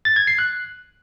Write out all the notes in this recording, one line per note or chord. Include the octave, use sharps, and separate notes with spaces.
A6
G#6
C7
F#6